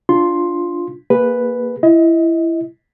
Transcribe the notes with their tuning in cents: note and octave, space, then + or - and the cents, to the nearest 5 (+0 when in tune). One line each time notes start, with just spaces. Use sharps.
D4 +0 F4 -5 C6 +5
A#3 +0 G#4 -35 B4 +0
E4 +20 D#5 +30